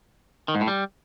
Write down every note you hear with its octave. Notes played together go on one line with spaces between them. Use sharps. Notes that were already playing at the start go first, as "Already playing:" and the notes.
D#3
G#2
A2
G3